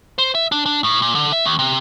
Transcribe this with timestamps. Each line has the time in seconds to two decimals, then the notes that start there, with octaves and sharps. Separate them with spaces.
0.18 C5
0.35 E5
0.52 D4
0.66 D4
0.84 A2
1.02 A#2
1.15 D3
1.32 E5
1.45 D#2
1.59 C3